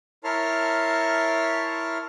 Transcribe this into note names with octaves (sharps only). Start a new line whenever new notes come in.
E4 A#4 C#5 A5 C6 F6